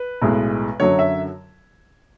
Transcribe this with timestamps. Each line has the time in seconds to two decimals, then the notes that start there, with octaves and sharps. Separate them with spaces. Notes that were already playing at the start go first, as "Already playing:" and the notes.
Already playing: B4
0.22 B1 A2 G#3
0.80 F#2 D3 F#3 C#5
0.99 E5